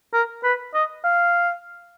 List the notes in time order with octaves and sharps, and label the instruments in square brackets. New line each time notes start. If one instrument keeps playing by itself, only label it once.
[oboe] A#4
B4
D#5
F5